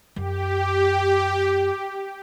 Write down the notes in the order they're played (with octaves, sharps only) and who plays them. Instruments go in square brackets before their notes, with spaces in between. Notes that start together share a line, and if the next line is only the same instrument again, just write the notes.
[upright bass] F#2 [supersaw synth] G4